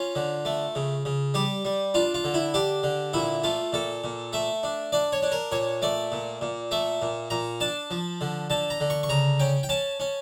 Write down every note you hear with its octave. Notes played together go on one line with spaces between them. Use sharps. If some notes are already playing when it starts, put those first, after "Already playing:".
Already playing: C#4 F4
D3
A3
C#3
C#3
G3 G4
G3
D4 F4
F4
D3
E4
D4 G4
D3
A#2 E4
A3 F4
A#2 A4
A#2
A3 E5
D4
D4 D5
C#5
D4
A#4
A#2 C#5
A3 D5
A#2
A#2
A3 E5
A#2
A#2 A#5
D4 A5
F3
D3
D3 A5
A#5
D3
C#6
C#6
C#3 A#5
C#4 G5
G5
C#4 A5
C#4